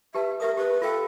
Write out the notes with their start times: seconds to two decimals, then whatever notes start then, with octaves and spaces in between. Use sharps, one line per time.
0.15 G4 B4 E5 A5
0.40 G4 A#4 E5 D#6
0.57 G4 B4
0.82 F4 A4 F5 G5